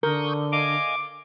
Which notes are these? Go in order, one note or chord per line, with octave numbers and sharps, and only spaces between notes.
D3 A#4 C#6 D#6 G6
D#5 F5 G#5 D6